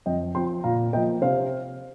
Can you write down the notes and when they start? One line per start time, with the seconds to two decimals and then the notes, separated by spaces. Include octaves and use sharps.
0.06 F2 D#5 G5
0.35 F3 C4 G5 C6
0.64 A#2 F5 A#5
0.93 A#3 D#5 G5
0.97 F3
1.22 C3 C5 F5